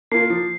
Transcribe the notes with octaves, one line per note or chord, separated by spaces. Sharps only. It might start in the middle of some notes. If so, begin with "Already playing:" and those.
A#3 F4 C7
F3 C7